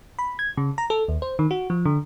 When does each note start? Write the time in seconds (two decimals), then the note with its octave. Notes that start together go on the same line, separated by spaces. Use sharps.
0.19 B5
0.39 G#6
0.57 C#3
0.78 A#5
0.90 A4
1.08 D#2
1.22 C5
1.39 D#3
1.51 F#4
1.70 F3
1.85 D3